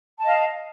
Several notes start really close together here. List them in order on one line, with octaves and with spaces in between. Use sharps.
A5 D#5 F5